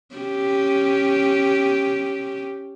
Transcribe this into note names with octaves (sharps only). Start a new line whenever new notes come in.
C#4 G4